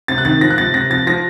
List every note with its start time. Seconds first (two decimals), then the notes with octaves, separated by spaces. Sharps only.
0.08 C3 A6
0.18 F#6
0.25 D#3 A6
0.41 F3 A#6
0.51 F#6
0.58 C3 A6
0.74 C3 A#6
0.90 F3 A6
1.07 F3 A#6